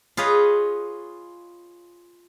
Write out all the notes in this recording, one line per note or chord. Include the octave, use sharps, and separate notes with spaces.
F4 G#4 B4 C#5 D#5